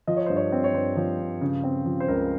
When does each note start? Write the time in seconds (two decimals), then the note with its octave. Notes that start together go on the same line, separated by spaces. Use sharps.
0.07 F3 D#5
0.17 C#5
0.26 G2 C5
0.36 C#5
0.52 C4
0.64 C#5
0.74 G2 C5
0.97 F3
1.19 G2
1.41 C#3
1.64 C4
1.86 F3
2.00 C5
2.08 C#2 A#4